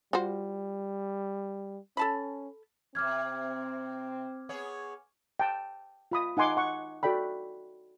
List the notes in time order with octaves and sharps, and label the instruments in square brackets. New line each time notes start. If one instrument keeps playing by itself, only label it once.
[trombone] G3 [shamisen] F4 F#4 C5
[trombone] C#4 [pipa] A4 A5 B5
[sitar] F#2 C3 [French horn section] C4 [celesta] D6 F6 G#6
[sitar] B3 G#4 C#5
[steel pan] G5 A5
F4 B5 D#6
D#4 F#5 G#5 C6 D6
F#5 C#6
F#4 A4 D5 G5 B5